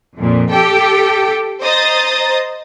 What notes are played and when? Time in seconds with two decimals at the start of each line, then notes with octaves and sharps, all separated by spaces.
0.16 F2 A#2
0.50 G4 A4 G5
1.62 C5 D#5 A#5 D#6 A6